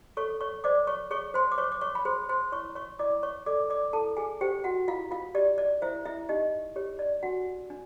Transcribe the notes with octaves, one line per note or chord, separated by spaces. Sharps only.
A4 C#5 C#6
C#5 C#6
C5 D5 D6
C#5 C#6
G#4 C#5 C#6
C5 C6
D6
C5 C#5 C#6
D6
C#5 C#6
B5
G#4 C5 C6
C5 C6
E4 C#5 C#6
C#5 C#6
E4 D5 D6
C#5 C#6
A4 D5 D6
D5 D6
E4 A4 A5
G#4 G#5
G4 C5 G5
F#4 F#5
E4 F4 F5
F4 F5
G4 D5
D5
E4 C5 E5
E4 E5
D#4 G4 D#5
G4 C#5
D5
D4 F#4 F#5
D4